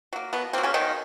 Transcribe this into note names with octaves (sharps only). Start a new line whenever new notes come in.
F#3 A#3
B2 B3
F#3 A#3 C4
C#3 C#4
B2 D#3 D#4